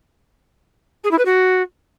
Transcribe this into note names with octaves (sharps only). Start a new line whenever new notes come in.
G#4
E4
B4
F#4